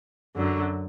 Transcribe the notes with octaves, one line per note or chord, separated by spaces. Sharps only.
F#2 D3 F#3